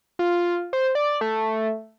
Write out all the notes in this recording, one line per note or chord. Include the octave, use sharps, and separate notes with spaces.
F4
C5
D5
A3